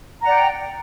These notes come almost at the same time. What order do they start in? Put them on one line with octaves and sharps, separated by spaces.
A#5 F#5 D5 G5